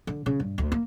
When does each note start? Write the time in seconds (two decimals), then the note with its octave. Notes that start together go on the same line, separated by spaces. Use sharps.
0.07 D3
0.26 C#3
0.40 G2
0.58 D2
0.72 A#3